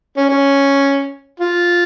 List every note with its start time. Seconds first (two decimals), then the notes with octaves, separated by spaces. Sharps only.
0.17 C#4
0.29 C#4
1.40 F4